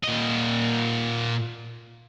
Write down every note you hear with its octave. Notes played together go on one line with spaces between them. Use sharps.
A#2 D#5